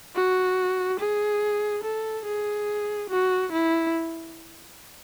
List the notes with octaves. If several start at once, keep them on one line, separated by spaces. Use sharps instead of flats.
F#4
G#4
A4
G#4
F#4
E4